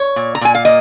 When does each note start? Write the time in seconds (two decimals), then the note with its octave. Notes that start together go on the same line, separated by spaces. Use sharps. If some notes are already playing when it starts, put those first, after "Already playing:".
Already playing: C#5
0.16 A#2
0.35 A#5
0.41 A#2 G#5
0.55 F5
0.65 A#3 D#5